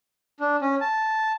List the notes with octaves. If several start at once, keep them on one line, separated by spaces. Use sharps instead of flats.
D4
C#4
A5